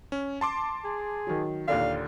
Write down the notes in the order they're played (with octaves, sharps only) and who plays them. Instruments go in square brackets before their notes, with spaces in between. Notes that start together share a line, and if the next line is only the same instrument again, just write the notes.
[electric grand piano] C#4
A5 C6 D6
[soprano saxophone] G#4
[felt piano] D#3 F#3
[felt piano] D#2 A#2 D3 [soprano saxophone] F5